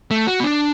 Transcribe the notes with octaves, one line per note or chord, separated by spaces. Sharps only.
A3
F#4
B3
D4